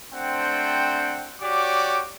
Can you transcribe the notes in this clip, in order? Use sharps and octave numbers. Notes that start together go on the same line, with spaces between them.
A3 C4 D4 C5 F#5 G5
F#4 G4 C#5 D5 D6